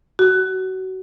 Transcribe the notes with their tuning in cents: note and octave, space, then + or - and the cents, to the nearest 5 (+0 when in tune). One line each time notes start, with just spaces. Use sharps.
F#4 +25